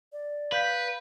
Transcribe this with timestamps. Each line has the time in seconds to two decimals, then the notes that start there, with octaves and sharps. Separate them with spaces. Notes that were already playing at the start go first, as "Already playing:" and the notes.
0.13 D5
0.52 B4 F5 G6 B6